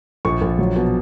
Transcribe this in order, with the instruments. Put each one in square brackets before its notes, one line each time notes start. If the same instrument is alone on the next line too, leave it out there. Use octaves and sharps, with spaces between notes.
[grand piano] A#1 C#6
A#1
F#3
B2